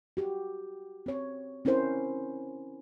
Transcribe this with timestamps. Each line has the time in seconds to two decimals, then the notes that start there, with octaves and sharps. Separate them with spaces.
0.17 F#4 G4
1.06 C4 C#5
1.65 C4 C#4 E4 A#4 C5